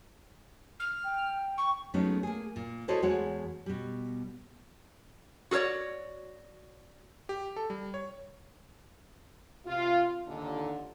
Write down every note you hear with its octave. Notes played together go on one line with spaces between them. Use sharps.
F6
G5
C#6
F#3 G#3 A3 B3 C#4 D#4
A#3 G#4
A#2
E4 F#4 A4 C5 C#5 D#5
E2 G#3 F#4 C#5 F#5
B2 G3
F#4 G#4 A#4 C#5 D5
G4
A4
G3
C#5
C3 F4
D#2 A#2 D3